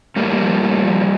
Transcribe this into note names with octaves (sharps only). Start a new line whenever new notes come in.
A2 G3 A#3
F3
A2
F3